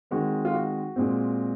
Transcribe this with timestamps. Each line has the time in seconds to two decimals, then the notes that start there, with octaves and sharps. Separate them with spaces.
0.11 D#3 G#3 C4 F#4
0.45 F4
0.54 F#4
0.96 A#2 G#3 C4